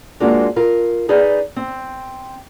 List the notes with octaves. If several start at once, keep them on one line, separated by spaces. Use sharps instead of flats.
G#3 A#3 C4 D4 F4 F#4
F4 A#4
D#4 G#4 B4 D5 D#5
C4